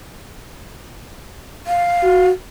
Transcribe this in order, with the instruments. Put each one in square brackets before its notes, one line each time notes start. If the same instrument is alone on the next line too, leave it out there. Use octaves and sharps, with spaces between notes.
[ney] F5
[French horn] F#4